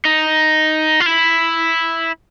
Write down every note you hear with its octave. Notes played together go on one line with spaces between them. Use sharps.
D#4
F4
E4